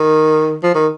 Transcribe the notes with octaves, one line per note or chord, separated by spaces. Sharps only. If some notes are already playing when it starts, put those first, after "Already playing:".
Already playing: D#3
F3
D#3